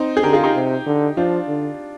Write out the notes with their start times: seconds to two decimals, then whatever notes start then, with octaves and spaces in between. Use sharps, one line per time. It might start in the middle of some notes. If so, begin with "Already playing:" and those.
Already playing: C4 D#4
0.17 G#4
0.23 D3 G4 A#4
0.33 F4 G#4
0.44 D#4 G4
0.54 C3
0.86 D3
1.17 F3 D4 F4
1.48 D3